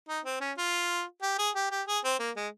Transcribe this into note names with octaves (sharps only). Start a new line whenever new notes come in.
D#4
C4
C#4
F4
G4
G#4
G4
G4
G#4
C4
A#3
G#3